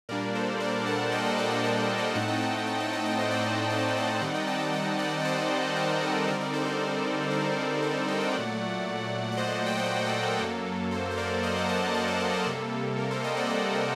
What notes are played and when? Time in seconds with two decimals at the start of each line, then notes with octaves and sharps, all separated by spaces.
0.09 A#2 G3 A#3 D4 A#4 D5
0.35 A4 C5
0.60 A#4 D5
0.86 F#5 A5
1.12 D#5 G5
1.25 D#5 G5
1.38 F#5 A5
1.50 D#5 G5
1.64 D5 F#5
1.81 D5 F#5
1.98 D#5 G5
2.15 A2 A3 C4 D#4 F#5 A5
2.28 D#5 G5
2.41 F#5 A5
2.54 F#5 A5
2.67 D#5 G5
2.80 F#5 A5
2.93 D#5 G5
3.05 D#5 G5
3.18 C5 D#5
3.31 D5 F#5
3.44 D5 F#5
3.70 A5
3.79 G5
3.89 F#5
3.97 D#5 G5
4.21 D#3 G3 C4 D#4 D5 F#5
4.34 D#5 G5
4.47 F#5 A5
4.60 D#5 G5
4.73 F#5 A5
4.99 D5 F#5
5.20 F#5
5.25 C5 D#5
5.76 A#4 D5
6.02 A4 C5
6.27 D3 G3 C4 D#4 A#4 D5
6.40 A#4 D5
6.53 A4 C5
6.66 A#4
6.79 A#4
7.31 A#4
7.82 A4 C5
8.08 D#5 G5
8.21 D5 F#5
8.34 A#2 F#3 A3
9.32 F#5
9.37 C5 D#5
9.66 G5
9.77 F#5
9.86 D#5
9.96 D5
10.06 A4 C5
10.23 A#4
10.40 F#2 F#3 A#3 A4
10.91 A4 C5
11.11 C5
11.17 A#4 D5
11.43 C5 D#5
11.56 D5 F#5
11.69 F#5 A5
11.94 C5 D#5
12.08 A#4 D5
12.21 A4
12.30 C5
12.34 A#4
12.46 C3 G3 A#3 A4
12.98 A#4
13.11 A4 C5
13.24 D#5 G5
13.37 D5 F#5
13.50 C5 D#5
13.75 A#4 D5